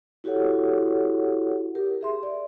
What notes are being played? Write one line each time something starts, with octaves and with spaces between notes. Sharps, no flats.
E4 F#4 G4 A4 C#5 F#5
G4 A#4
G#4 E5 C6
D5